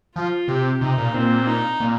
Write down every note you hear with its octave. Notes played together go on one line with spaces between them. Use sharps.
F3 F4
C3 G4
C3 D#4
A#2
A#2 C4
D#4
A#2